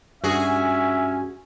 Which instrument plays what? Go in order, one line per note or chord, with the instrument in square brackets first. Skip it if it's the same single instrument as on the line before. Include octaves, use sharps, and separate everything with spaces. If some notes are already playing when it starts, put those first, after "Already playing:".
[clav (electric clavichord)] G2 [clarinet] C#4 [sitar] F#4 G#4 [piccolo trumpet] E5